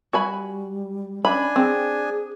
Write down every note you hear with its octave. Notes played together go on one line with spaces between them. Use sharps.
G3 F#4 G#5 B5
C#4 D4 G#5 B5
C4 G#4